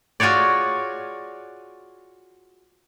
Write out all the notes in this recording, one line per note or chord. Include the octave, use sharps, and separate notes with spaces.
F4 F#4 G#4 C#5 D5